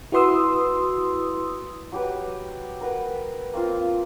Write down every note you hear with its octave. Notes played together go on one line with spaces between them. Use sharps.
E4 F#4 B4 C6 D#6 E6
F#3 G4 B4
A#4 B4 F#5 G5
A#3 C4 F4